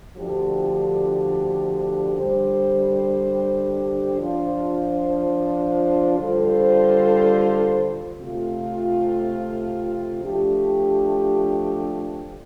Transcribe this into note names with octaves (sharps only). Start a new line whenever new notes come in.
D2 D3 F3 D4 G4
D3 G3 D4 G4 C5
F3 D4 F4 C5
D3 G3 F4 A4 C5
C3 A3 F4
F3 A3 D4 G4